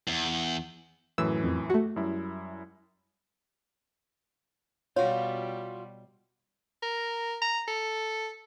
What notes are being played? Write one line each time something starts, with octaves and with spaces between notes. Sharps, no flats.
E2
F#2 A2 E3 E6
F2
A3 F#4
F#2 G3 E4
B2 G3 F4 F#4 C#5
A#4
A#5
A4